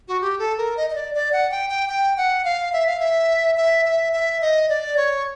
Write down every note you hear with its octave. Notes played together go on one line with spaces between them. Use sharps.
F#4
G4
A4
A#4
D#5
D#5
D5
D5
F#5
G5
G5
G5
F#5
F5
E5
F5
E5
E5
E5
E5
D#5
D5
C#5